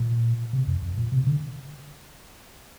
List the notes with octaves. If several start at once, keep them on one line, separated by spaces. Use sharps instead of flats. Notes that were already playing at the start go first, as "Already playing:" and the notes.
Already playing: A#2
C3
F2
F2
A#2
C3
D3